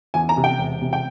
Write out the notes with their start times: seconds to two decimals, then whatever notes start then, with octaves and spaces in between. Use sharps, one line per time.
0.14 E2 G#5
0.29 A#5
0.37 C3
0.44 G5
0.59 E1
0.82 C3
0.93 G5